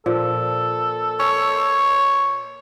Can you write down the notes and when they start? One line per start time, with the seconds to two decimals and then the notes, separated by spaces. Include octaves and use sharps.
0.06 A#2 F3 A4
1.20 C#5